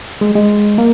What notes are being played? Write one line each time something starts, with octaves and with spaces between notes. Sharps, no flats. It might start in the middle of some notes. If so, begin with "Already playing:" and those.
G#3
G#3
A#3